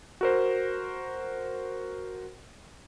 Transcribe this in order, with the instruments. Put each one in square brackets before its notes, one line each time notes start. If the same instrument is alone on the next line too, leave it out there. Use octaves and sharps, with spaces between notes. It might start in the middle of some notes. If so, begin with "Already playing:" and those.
[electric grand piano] F#4 A#4 C5